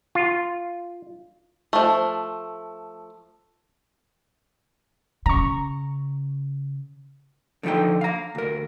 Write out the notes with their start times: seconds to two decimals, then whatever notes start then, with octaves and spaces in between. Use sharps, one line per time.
0.15 F4
1.73 F3 A3
5.26 C#3 A#5 C#6
7.63 D3 F3 D#4 A4 G5
8.01 F5 A#5
8.35 D2 A#4